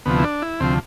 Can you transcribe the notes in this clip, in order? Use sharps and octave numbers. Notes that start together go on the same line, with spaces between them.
D2 C3 F3 B3
E4
D4
E4
D2 C3 F3 C4